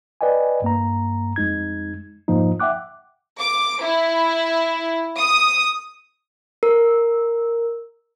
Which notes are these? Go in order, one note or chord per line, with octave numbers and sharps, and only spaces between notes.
B4 D5 D#5 G5 G#5
G2 A#3 A#5
F2 G#3 D#4 G#6
F2 G#2 F3 A#3 D#4
E5 F#5 G5 D6 F#6
D6
E4
D#6
A#4